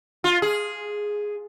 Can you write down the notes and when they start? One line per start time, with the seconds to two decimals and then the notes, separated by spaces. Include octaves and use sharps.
0.24 F4
0.42 G#4